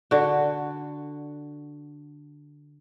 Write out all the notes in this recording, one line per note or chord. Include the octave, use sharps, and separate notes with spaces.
D3 F#4